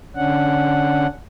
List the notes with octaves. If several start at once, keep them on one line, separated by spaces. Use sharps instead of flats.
D3 C#4 D4 F#5